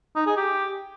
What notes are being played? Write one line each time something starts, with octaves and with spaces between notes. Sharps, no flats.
D#4
G#4
G4